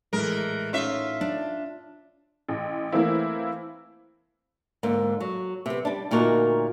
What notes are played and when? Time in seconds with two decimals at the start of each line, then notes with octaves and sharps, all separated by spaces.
0.13 A#1 A2 E3 G#3 A4 A#4
0.73 C#4 D#4 F4 E5
1.21 D4
2.48 A1
2.92 E3 A3 A#3 C4 E4
4.83 G#2 D3 A#3
5.20 F#3
5.66 C3 B3
5.85 G3 D4
6.11 D2 A#2 D#4 F#4 A#4